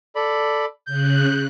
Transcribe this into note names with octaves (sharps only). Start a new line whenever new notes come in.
A4 D5 B5
C#3 F#6 G6